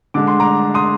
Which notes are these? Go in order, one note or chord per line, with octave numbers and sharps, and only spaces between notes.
D3 G#3 D6
C6
A#5 D6
C6 D#6